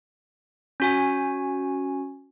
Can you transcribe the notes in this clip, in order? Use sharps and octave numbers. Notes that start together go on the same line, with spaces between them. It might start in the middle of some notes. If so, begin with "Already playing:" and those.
C#4 F#4 G#5